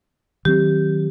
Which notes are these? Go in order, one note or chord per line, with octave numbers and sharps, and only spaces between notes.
D#3 F#3 C4 G4